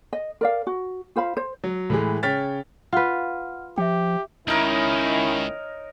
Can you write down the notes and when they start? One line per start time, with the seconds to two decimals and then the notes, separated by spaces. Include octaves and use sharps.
0.13 D#5
0.41 A#4 D5 F5
0.67 F#4
1.16 F4 C5 F5 B5
1.37 C5
1.64 F#3
1.90 A2 E3 G#3
2.23 C#3 C#5 G5 F6 A6 B6
2.93 F4 B4 F#5 F6
3.78 F3 G4 E5 G5
4.48 C#2 D#3 C#4 D#4 E4 A#4 C#5